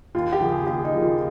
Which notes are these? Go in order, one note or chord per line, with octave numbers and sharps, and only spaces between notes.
D#2 F4
G4
C#3 F3 A#3
G#4
D#2 G4
D#4
C#3 F3 A#3
F4